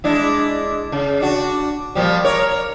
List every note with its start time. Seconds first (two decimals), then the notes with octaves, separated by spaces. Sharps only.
0.04 G#3 D4 E4
0.92 C#3
1.20 D4 F#4
1.95 A#2 F3 G3
2.25 A#4 C#5